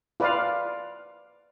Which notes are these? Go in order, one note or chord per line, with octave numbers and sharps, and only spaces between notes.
F4 B4 D5 F5